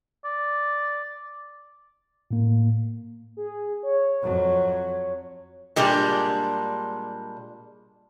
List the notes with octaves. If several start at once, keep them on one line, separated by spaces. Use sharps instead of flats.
D5
A2 A#3
G#4
C#5
F2 F#3
A#2 G3 G#3 D4